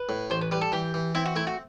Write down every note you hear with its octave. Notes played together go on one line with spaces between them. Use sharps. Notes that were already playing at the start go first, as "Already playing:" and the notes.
Already playing: B4
A2
A1 C5
B4
G3 B4
A4
E3 G4
E3
C4 E4
F#4
A3 E4
F#4